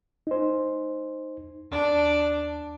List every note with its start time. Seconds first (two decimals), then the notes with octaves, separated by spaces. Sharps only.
0.27 D#4 C5
1.71 D#2 D4 D5